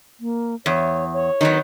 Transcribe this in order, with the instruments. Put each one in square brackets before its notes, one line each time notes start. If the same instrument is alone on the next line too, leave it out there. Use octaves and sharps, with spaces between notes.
[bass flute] A#3
[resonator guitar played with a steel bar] E2 [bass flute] C#5
[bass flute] C#5
[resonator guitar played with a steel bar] D#3 F#3 B3